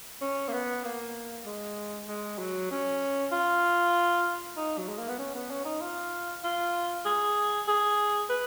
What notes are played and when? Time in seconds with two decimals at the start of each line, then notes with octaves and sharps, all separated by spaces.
0.21 C#4
0.48 A#3
0.53 B3
0.84 A#3
1.46 G#3
2.08 G#3
2.39 F#3
2.71 C#4
3.32 F4
4.57 D#4
4.78 F#3
4.89 G#3
4.98 A#3
5.09 B3
5.19 C#4
5.35 B3
5.50 C#4
5.65 D#4
5.81 F4
6.44 F4
7.05 G#4
7.68 G#4
8.29 B4